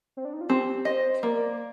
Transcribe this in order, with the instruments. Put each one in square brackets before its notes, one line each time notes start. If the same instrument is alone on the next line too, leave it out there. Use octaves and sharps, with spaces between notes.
[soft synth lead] C4
D4
D#4
F4
[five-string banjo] C4 [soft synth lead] G4
[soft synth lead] C5 [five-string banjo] D#5
[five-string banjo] A#3 [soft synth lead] D5